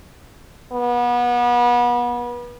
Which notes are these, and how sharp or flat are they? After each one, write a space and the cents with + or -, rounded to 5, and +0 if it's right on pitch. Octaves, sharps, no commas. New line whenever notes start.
B3 -30